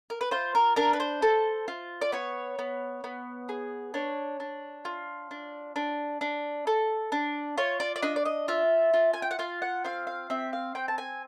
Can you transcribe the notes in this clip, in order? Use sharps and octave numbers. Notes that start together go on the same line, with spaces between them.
A#4
B4
F4 C5
A#4
D4 A#4
B4
C5
A4
F4
D5
B3 C#5
B3
B3
G#4
D4 C#5
D4
F4
D4
D4
D4
A4
D4
F4 C#5
D5
D5
D4 D#5
D5
D#5
F4 E5
F4
G#5
G5
F#5
F4 F5
F#5
C4 F5
F5
C4 E5
F5
C4 G5
A5
G#5